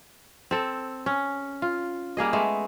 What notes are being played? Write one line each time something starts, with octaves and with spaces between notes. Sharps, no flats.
C4 A4
C#4
F4
G3 A#3 G#4 D#5
G#3 A3 B3